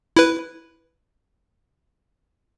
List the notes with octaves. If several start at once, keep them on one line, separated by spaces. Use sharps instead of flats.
E4 B4